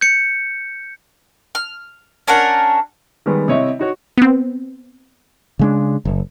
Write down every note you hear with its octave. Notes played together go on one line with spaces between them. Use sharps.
G6 C#7
F6
C#4 D4 A#4 F#5
D#3 G3 G#3 B3
C3 E4 C#5 D#5
D#4 F#4 C#5
B3 C4
C#3 G#3 D4
F#1